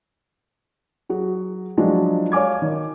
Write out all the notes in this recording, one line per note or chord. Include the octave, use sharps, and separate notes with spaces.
F#3 F#4 G#4
F3 F#3 G#3 D4
C#5 F5 G#5 D6 G#6
D#3